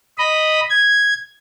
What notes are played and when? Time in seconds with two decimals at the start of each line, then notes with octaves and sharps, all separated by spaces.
0.18 D#5 B5
0.70 G#6